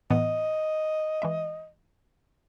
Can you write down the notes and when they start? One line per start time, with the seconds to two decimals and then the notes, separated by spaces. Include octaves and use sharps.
0.10 A2 E3 B3 D#5
1.22 E3 G#3 E5